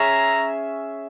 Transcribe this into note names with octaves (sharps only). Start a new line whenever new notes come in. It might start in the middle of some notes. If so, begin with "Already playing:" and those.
Already playing: C#4 G#4 C#5 E5 A#5